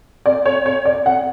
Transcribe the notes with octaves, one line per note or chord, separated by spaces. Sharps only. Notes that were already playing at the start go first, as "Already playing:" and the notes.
D5
C#5
C#5
D5
F#5